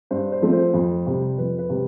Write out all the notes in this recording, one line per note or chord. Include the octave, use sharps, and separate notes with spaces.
G2 C5
C5
F3 A3 C4
C5
F2
C3 G3
F2 B4
B4
C3 G3